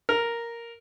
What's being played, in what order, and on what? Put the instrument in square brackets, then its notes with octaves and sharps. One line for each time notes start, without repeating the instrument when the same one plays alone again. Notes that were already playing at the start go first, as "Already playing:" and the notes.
[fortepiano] A#4